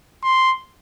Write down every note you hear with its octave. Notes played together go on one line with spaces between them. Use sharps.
C6